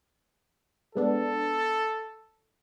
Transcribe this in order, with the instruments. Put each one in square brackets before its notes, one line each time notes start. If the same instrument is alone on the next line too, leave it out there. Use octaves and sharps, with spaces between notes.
[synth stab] G#3 B3 D4 [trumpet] A4